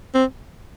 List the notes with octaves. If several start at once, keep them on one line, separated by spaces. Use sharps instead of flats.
C4